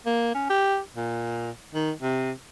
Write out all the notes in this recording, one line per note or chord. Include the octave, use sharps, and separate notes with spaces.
A#3
C#4
G4
A#2
D#3
C3